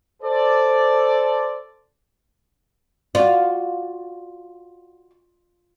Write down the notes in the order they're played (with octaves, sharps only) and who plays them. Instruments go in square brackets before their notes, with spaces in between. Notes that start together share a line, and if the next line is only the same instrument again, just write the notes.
[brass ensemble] A4 C5 D5
[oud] F4 [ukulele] F#4 D5